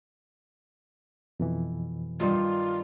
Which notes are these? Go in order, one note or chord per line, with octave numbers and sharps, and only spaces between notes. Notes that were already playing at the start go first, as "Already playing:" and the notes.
F2 B2 E3
G2 D#3 G3 F4